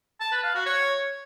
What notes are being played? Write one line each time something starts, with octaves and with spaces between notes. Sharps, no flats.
A5
B4
F5
F#4
C#5